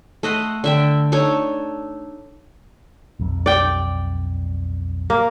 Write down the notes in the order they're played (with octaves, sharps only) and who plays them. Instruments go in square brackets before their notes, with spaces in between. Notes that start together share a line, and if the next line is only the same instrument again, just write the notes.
[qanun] A3 D#5 F#5 C6
D3 E5 G5
D4 D#4 A4 C#5
[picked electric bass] B1 F2
[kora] D5 G5
A#3